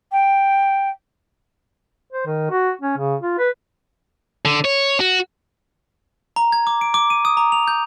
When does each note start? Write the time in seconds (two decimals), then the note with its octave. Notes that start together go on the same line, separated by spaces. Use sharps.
0.11 G5
2.13 C5
2.26 D#3
2.51 F#4
2.81 C#4
2.98 C#3
3.21 F4
3.39 B4
4.45 D3
4.65 C#5
5.00 F#4
6.36 A#5
6.52 G#6
6.67 D6
6.81 D7
6.94 D6
7.10 D#7
7.25 D#6
7.37 A#5
7.52 F7
7.68 G6